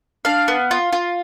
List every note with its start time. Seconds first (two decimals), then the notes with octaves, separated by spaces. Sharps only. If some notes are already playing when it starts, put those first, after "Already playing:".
0.25 D4 F5
0.48 B3
0.71 F4
0.93 F4